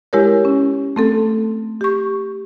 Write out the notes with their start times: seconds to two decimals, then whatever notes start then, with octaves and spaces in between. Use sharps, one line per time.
0.13 G#3 E4 G4 A#4 C#5
0.45 C#4
0.96 A3 C4 A4
1.81 G4 C#6